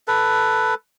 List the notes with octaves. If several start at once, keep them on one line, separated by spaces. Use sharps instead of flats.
A4 B4